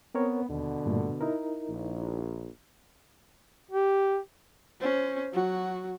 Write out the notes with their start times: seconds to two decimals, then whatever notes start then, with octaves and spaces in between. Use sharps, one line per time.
0.15 B3 C4 A#4 C#5
0.49 D#2 B2 D3
0.86 G2 A#2 A3
1.21 D#4 E4 A#4
1.69 A#1
3.71 G4
4.81 C#4 C5
5.33 F#3 F#4